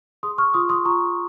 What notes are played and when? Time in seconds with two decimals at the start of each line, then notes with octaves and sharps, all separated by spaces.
0.23 G#4 C6 D#6
0.38 C#6 F6
0.54 F4 C6 D#6
0.69 C6 D#6
0.85 F4 A#5 C#6